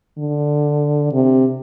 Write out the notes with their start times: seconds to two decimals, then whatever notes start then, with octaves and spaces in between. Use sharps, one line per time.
0.18 D3
1.12 C3